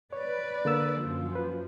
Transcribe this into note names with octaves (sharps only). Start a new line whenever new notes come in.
B4 C#5 D5
D3 A#3 E6
F#2 F3
B4